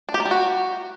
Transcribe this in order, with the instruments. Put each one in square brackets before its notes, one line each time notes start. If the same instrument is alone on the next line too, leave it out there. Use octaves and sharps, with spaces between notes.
[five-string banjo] D4
G4
A#3
G3
F#4